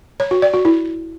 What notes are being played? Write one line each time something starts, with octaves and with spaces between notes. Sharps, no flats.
C#5
F#4
D5
F#4
E4